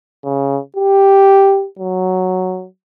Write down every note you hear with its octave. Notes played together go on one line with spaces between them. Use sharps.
C#3
G4
F#3